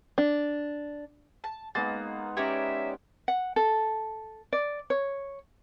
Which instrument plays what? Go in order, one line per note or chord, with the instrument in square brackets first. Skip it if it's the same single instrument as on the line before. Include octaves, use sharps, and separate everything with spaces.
[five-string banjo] D4
[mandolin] A5
[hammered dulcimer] G#3 B3 D#4 [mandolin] A#3 [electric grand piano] A6
[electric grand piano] C#4 G4 [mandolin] C#5 D5 A#5 [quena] E5
[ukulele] F#5
A4
D5
C#5